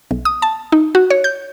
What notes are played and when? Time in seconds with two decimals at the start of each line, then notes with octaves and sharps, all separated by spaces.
0.11 B1
0.25 D#6
0.42 A5
0.72 D#4
0.95 F#4
1.10 C#5
1.24 G6